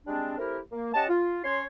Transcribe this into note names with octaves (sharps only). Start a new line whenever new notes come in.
G3 G#3 C4 D4
A3 C4 E4 G4 A#4
A#3
C#4 G4 D#5 F#5 A5
F4
C#4 C#5 C6